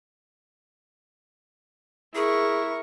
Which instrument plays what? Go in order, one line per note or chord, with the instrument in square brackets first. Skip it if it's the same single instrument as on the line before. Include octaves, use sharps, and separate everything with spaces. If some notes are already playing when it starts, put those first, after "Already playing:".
[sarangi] E4 [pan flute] G#4 [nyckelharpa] A#4 C#6